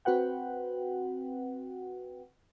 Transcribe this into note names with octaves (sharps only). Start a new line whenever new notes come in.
C4 F#4 B4 F#5 G5